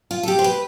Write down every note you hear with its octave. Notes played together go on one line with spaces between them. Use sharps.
F4
A4
G4
C5
B4